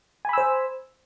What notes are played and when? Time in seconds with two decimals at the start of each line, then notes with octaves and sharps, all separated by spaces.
0.25 G#5
0.29 B5
0.33 E6
0.38 C5